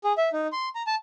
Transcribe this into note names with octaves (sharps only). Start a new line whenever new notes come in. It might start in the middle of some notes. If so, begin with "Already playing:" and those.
G#4
E5
D#4
C6
A#5
A5